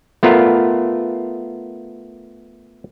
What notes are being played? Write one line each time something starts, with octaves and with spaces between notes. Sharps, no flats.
A3 B3 F4 A#4